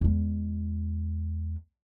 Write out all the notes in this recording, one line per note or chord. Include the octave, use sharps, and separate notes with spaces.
E2 G#3